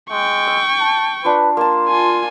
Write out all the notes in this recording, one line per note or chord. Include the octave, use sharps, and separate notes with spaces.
G#3 G5 C#6
E6
A5
D4 F4 B4
A#3 A5 C6
F4 G#5